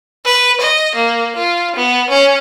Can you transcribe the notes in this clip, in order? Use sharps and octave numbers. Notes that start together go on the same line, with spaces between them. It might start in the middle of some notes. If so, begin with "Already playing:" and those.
B4
D#5
A#3
F4
B3
C#4